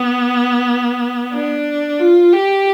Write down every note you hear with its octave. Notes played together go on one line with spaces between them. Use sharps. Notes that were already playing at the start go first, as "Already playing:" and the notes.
Already playing: B3
D4
F4
G4